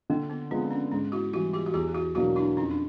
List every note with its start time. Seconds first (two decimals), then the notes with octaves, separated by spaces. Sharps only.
0.10 D3 A#3
0.30 B3
0.51 F3 G#3 B3 C4
0.71 C#4
0.91 G#2 C#4
1.12 E4 F#4
1.33 E3 G3 E4 F#4
1.53 F4 G4
1.66 F#4
1.74 E2 F4 G4
1.95 E4 F#4
2.15 B2 F#3 A#3 D4 E4 F#4
2.36 D4 E4
2.57 F2 C#4 D#4
2.71 D4